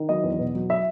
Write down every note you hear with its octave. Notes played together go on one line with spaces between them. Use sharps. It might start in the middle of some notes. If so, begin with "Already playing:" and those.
Already playing: D#3
F#3 D#5
E2
B2
F#3
E5